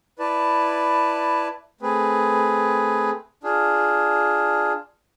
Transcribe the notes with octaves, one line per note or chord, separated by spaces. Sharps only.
E4 B4 D5 A5
A3 C4 G#4 B4
D4 F4 G#4